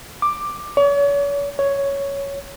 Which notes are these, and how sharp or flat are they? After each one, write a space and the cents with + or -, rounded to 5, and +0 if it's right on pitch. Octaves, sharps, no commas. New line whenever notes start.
D6 +10
C#5 +40
C#5 +5